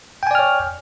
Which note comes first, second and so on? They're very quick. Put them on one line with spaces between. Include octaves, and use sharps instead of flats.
G5 G#5 D5 F6 C#5